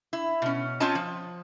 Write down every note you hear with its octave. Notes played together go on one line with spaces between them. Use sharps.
E4
B2 C#4
C4 C#4 F4 C#5 D#5 A5
F3